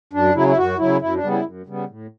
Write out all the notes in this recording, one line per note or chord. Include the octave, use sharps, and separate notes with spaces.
F#2 D4
C#3 F#3 E4
E4
F#2 F#4
C#3 F#3 E4
F#2 E4
D4
C#3 G3 B3
E4
F#2
C#3 G3 B3
A2